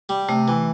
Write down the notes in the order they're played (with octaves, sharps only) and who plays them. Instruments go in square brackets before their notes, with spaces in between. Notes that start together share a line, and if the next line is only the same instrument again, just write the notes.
[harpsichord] G3
[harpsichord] C3 [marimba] A3
[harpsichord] E3